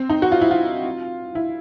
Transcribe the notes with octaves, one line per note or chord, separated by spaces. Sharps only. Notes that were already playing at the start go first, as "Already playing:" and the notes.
Already playing: C4
D#4
F#4
F4
E4
F4
E4